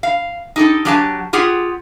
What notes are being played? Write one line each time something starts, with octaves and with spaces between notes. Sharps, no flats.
F5
D#4 G4 A4
F#3 D4 G4 F5 G#5 A5
F4 G4 G#4 F#5